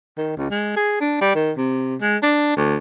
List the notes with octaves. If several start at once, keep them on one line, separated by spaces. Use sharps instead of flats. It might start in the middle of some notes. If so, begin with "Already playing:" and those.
D#3
C#2
G#3
G#4
D4
G3
D#3
C3
G#3
D4
D2